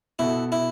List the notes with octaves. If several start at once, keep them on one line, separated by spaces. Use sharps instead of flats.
B2 B3 E4 F#4 A4
E4